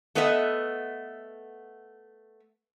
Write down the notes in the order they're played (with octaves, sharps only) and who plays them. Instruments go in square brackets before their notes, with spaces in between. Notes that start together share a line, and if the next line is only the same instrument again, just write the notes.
[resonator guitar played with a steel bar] A3 B3 B4 D#5 E5